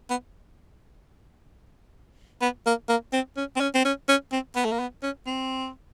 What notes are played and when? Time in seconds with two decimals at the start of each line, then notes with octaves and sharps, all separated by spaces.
0.10 B3
2.41 B3
2.66 A#3
2.89 A#3
3.13 C4
3.37 C#4
3.56 C4
3.60 C#4
3.74 C4
3.85 C#4
4.08 C#4
4.32 C4
4.56 B3
4.65 A3
4.72 A#3
4.79 B3
5.03 C#4
5.26 C4